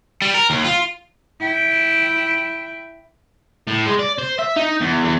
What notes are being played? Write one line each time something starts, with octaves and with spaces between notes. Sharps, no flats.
G3
A#4
D#2
F4
E4 G5
A2
G#3
D5
C5
E5
D#4
E2
E2